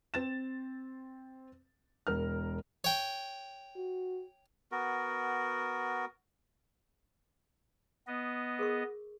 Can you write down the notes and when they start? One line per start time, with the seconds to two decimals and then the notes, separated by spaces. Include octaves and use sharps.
0.14 C4 A6 E7
2.07 E1 A#4 F6
2.84 C#5 G5
3.76 F#4
4.72 B3 F#4 A#4
8.07 B3 D#5
8.59 G#4 A#4 C#6